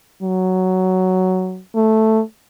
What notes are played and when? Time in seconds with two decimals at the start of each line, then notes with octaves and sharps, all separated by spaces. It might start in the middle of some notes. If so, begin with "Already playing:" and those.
0.23 F#3
1.75 A3